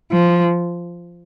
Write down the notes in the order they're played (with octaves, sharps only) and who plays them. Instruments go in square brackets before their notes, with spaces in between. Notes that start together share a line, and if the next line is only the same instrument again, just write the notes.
[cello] F3